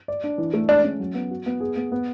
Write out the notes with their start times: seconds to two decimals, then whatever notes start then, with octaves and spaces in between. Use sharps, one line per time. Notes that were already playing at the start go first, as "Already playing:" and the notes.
0.08 D5
0.24 D4
0.38 E3
0.53 A3
0.69 G#3 D4
0.84 C#4
1.00 F#3
1.15 B3
1.31 F#4
1.46 B3
1.60 G#4
1.77 B3
1.92 B3